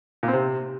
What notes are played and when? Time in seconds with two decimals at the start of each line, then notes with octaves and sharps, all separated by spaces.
0.23 A#2
0.28 C4
0.33 C3